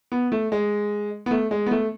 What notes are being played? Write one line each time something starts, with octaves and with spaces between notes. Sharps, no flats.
B3
A3
G#3
B3
A3
G#3
B3
A3